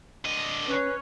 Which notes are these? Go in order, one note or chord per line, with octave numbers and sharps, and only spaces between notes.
D3 D#5
C#4 B4 C#5